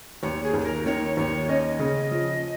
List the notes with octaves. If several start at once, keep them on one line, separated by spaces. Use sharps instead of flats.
D#2 C#5
G#4
D#2
G#4
A#4
D#3 C#5
D#2 C#5
C#4 D#5
C#3
F3